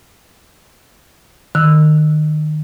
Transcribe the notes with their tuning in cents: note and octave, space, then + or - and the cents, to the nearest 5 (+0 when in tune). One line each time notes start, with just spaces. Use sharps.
D#3 -25 E6 +0